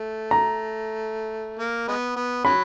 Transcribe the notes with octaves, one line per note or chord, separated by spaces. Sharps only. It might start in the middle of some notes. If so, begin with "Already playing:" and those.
Already playing: A3
A#5
A#3
G#3 B3
B3
C#3 F#3 B5